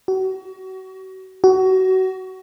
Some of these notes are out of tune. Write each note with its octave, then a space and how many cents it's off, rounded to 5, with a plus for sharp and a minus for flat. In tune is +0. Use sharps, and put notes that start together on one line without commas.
F#4 +35
F#4 +25